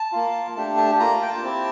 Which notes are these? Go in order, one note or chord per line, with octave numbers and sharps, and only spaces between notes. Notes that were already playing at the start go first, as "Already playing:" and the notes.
Already playing: A5
A#3 F4
A3 D4 G4 A5
A5
A#3 F4 A#5
G5
A5
C4 E4 G4